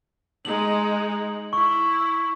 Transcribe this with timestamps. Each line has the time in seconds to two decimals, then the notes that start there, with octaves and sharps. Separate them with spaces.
0.45 G#3 D#4 F#7
1.53 E4 C#6